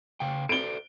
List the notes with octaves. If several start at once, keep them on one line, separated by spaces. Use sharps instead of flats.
C#3 F5 G5
A4 C5 D5 D7 G7